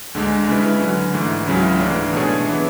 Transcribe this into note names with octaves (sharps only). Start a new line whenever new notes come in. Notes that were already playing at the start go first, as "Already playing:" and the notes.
D2 D3 G#3 D4
C#3 G#3 C#4 E4 B4
D3 F#3 C#4
G#2 E3 A3
C#2 C#3 F#3 C#4 E4
G#2 E3 A3 D4
B2 A3 D4 G#4 C#5
E3 B3 E4